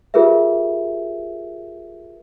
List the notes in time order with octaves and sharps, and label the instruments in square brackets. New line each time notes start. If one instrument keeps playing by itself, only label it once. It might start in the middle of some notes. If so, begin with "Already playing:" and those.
[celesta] F4 G4 G#4 A#4 B4 E5